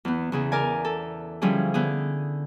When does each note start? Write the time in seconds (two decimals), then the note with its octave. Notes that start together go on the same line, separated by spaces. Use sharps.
0.05 E2 B3
0.32 E2 C#3 G#4
0.52 A#4 D5 G#5
0.85 A4
1.42 D3 F3 G3 C#4 E4 G#4
1.74 D3 B3 G#4